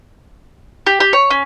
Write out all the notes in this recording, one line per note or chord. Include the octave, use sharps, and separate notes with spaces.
G4
G4
C#5
C#4